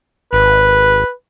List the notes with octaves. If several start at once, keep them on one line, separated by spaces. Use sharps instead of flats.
G#1 B4